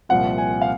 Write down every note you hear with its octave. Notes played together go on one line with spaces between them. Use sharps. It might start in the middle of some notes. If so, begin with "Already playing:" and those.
C2 A#2 F3 C4 F#5
G#5
F5